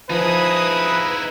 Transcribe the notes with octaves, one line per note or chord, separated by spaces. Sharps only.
F3 D#4 E4 G#4 B4 D#6